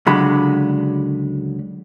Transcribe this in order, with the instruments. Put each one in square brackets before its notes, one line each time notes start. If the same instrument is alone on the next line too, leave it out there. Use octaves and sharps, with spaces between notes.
[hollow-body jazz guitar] C#2 D3 F#3 G#3 B5